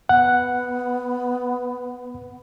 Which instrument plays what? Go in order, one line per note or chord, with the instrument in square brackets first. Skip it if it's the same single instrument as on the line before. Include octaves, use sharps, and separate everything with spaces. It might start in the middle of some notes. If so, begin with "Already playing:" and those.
[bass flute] B3 [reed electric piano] F#5